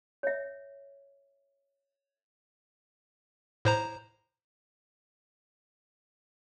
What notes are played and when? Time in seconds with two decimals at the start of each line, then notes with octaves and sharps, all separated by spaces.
0.23 C#5 E5
3.65 A2 C5 A#5